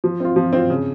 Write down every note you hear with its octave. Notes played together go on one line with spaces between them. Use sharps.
F3
C4 F4
F3
C4 F4
C#3